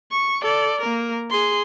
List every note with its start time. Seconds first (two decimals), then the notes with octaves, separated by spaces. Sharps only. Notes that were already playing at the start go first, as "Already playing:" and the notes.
0.11 C#6
0.42 A4 D5
0.81 A#3 A#4
1.30 G#4 C6